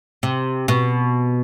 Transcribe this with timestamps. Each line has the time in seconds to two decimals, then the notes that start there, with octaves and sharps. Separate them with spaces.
0.23 C3
0.68 B2